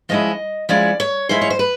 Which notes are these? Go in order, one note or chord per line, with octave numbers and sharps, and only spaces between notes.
F3 G#3 C#4 E4 D#5
F3 G#3 C#4 E4 D5
C#5
F3 G#3 C#4 E4 C5
C#5
C5
B4